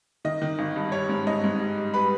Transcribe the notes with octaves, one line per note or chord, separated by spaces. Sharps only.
D#3 D#5
D#3
G#1
G2
G3 C#5
G#2
G#2 D#5
G#2
G3
G3
G3 B4 B5